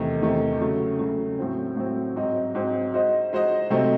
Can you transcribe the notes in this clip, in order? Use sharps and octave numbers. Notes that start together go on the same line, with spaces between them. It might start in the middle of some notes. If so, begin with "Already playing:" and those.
Already playing: E2 C3 D#3 A3
E2 C3 D#3 A3
C#3 F#3 A3
C#3 F#3 A3
A2 F#3 C4
A2 F#3 C4
G#2 F#3 C4 D#4
G#2 F#3 C4 D#4
G#3 D#4 F#4 C5 D#5
G#3 D#4 F#4 C5 D#5
C3 F#3 A3 C4 D#4